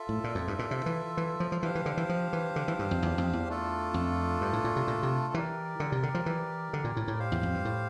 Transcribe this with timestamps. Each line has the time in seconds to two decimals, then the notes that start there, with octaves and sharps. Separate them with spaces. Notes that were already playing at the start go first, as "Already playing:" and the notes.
Already playing: F4 A4 E5
0.09 A2
0.24 A#2
0.35 F2
0.48 G2
0.59 A#2
0.71 C3
0.86 E3
1.17 E3
1.40 F3
1.52 F3
1.63 E3 D4 G4 C5 F5
1.75 E3
1.86 D3
1.97 E3
2.09 F3
2.33 E3
2.56 D3
2.68 E3
2.79 G2
2.91 F2
3.02 E2
3.18 F2
3.33 E2
3.49 A3 D4 F4 A4
3.94 F2
4.41 G2
4.53 A2
4.64 A#2
4.76 C3
4.88 A#2
5.03 C3
5.34 E3 G4 A#4 D5
5.80 D3
5.92 C3
6.03 D3
6.14 F3
6.26 E3
6.73 D3
6.84 A#2
6.97 A2
7.08 A2
7.19 G4 C5 F5
7.32 E2
7.43 F2
7.54 G2
7.65 A2